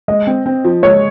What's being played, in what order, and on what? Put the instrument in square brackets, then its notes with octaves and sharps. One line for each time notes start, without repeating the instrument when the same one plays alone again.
[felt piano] G#3 [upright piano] D#5
[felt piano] C4
C4
F3
[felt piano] G#3 [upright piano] C#5